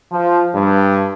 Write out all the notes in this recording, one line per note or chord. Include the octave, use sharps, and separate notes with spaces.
F3
G2